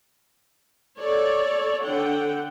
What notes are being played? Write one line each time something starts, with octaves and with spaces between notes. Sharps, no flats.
A4 C#5 D5
D3 F#5 G5